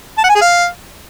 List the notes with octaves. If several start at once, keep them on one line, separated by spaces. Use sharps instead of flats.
A5
F#5
G#5
G#4
F5